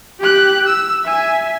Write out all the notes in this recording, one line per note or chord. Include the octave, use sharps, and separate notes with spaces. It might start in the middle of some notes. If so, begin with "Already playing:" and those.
G4 F#6
E6
E5 G#5